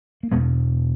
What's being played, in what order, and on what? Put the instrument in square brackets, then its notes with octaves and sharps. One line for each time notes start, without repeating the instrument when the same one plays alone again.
[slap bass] A#3
E2 B2 G#3 B3